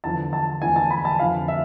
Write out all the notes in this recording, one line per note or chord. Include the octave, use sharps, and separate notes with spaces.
E2 D3 F3 A5
A5
E2 D3 F3 G#5
A5
B5
A5
F2 D3 F3 F5
E5